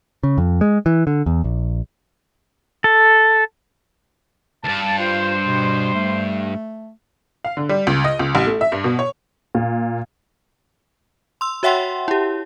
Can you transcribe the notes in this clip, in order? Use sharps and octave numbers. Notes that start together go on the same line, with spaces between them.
C#3
F2
G#3
E3
D3
E2
A#1
A4
D2 G2 A5
F4 C5
B2
A3
F5
D3
G3
C#2
D#5
C#2
A1
A3
E5
G2
B2
C#5
A#2
C6 E6
F#4 C#5 E5 F#5 G5 C6
E4 G4